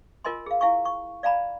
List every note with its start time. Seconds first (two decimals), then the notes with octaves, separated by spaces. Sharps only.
0.24 F4 A#4 D#5 G#5 C6
0.46 G#4 F5
0.61 E4 F5 G#5 C#6
0.85 C#6
1.23 D5 F5 G#5 A#5 B5